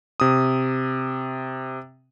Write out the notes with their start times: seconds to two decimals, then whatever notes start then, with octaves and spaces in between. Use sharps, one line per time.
0.20 C3 D#6